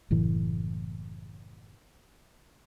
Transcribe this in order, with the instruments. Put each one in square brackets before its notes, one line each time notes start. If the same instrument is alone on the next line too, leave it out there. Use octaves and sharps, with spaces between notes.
[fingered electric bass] F#1 A2 E3 A3